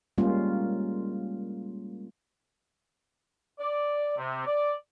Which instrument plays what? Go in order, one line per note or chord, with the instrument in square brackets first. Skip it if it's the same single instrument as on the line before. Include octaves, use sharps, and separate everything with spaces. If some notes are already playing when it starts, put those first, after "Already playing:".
[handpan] G3 G#3 A#3 C#4 F4
[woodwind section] D5
C3
D5